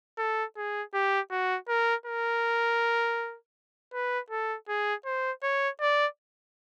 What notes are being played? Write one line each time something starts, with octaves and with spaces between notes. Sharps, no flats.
A4
G#4
G4
F#4
A#4
A#4
B4
A4
G#4
C5
C#5
D5